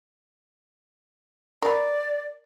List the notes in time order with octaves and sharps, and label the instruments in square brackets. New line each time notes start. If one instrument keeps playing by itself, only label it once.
[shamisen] A#4 B4 [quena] D5